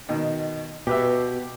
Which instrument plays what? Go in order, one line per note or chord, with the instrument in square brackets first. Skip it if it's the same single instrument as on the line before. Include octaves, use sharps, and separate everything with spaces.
[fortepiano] B2 D#3
[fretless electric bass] B2 [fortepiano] G4 B4 E5